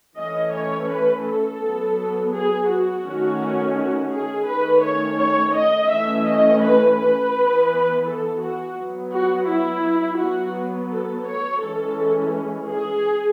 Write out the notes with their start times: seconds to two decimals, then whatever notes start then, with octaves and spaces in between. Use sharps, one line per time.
0.17 E3 A3 C#4 D#5
0.52 C#5
0.88 B4
1.23 A4
1.60 F#3 B3
2.32 G#4
2.67 F#4
3.04 D#3 A3 C#4
3.74 F#4
4.11 G#4
4.46 D#3 A3 C#4 B4
4.82 C#5
5.17 C#5
5.54 D#5
5.89 E3 A3 C#4 E5
6.26 D#5
6.62 B4
6.97 B4
7.32 E3 B3
8.05 A4
8.41 F#4
8.76 F#3 B3
9.12 F#4
9.47 E4
10.19 F#3 B3 F#4
10.91 A4
11.27 C#5
11.62 E3 G#3 C#4 A4
12.70 G#4